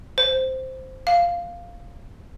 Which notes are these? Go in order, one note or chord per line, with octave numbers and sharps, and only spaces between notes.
C5
F5